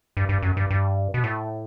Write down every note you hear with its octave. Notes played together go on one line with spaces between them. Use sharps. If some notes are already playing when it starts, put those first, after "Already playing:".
G2
G2
F#2
G2
G2
B2
A2